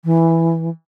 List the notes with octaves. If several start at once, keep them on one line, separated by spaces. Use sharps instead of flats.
E3